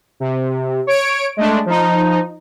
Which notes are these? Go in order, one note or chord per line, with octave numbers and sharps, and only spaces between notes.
C3
C#5 D7
G#3 A3 D4
F3 D#4